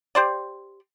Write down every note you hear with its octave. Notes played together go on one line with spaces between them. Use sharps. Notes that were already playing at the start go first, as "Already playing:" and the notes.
G4 C5 D5